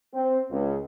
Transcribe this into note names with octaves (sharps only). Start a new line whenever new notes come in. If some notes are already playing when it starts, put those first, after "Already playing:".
C4
C#2